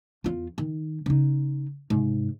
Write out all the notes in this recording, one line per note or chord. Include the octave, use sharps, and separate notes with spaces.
E2 F4
D#3
C#3 D#4
G#2 C3